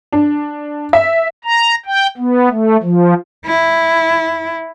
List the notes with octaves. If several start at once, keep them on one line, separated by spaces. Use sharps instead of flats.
D4
E5
A#5
G5
B3
A3
F3
E4